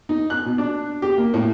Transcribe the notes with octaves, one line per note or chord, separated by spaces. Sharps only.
D#4
F#6
B2
D4
G4
A#3
A2